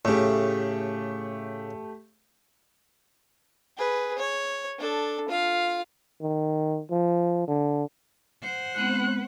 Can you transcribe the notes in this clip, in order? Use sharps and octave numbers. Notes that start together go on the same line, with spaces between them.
A2 C#3 A3 G4
G#4 B4
C#5
D4 A4
F4 F5
D#3
F3
D3
C5 F#5
G#3 B3 C4 F#6